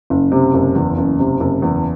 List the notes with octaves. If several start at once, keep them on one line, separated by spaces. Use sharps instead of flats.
F#1
C3
F#1
E2
F#1
C3
F#1
E2